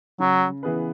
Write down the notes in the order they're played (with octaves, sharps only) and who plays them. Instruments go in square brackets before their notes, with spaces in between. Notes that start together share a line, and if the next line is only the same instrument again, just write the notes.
[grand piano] C#3 [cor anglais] F#3
[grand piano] E3 B3 G#4 B4